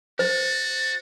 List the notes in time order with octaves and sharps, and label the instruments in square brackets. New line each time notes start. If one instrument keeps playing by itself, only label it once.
[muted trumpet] F#4 [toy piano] C5 [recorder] A6